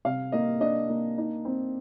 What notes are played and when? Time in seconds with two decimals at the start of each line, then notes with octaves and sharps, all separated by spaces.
0.05 C3 F5
0.32 A#3 D#5
0.61 D4 D#5
0.89 A#3
1.18 D#4
1.45 C4